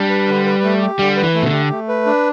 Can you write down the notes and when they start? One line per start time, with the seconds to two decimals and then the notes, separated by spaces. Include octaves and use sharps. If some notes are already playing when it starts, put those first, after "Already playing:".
Already playing: G3 D4
0.09 B4
0.28 D3
0.46 B4
0.63 A3
0.81 G4
0.99 D3 G3
1.17 B4
1.23 E3
1.35 A3
1.42 B2
1.46 D3
1.52 G4
1.71 A3
1.89 B4
2.06 D4